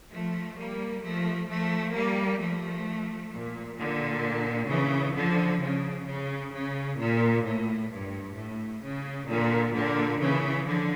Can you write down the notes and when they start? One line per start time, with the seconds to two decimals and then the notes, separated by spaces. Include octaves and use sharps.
0.10 F3 A3
0.57 G3 A#3
1.02 F3 A3
1.49 F3 A3
1.94 G3 A#3
2.40 F3 A3
3.31 A#2
3.77 A#2 D3
4.69 C#3 E3
5.15 D3 F3
5.61 C#3
6.06 C#3
6.52 C#3
6.98 A#2
7.45 A2
7.91 G2
8.37 A2
8.83 C#3
9.28 A#2 D3
9.73 A#2 D3
10.19 C#3 E3
10.65 D3 F3